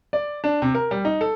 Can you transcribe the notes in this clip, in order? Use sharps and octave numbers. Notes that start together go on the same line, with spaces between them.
D5
D4
C3
A#4
G3
D#4
A4